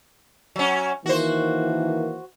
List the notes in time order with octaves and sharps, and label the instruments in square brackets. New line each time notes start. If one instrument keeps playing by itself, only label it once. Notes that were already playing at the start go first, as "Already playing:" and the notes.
[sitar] F#3 C#4
[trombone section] D#3 E3 A#3 [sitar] F#4 C5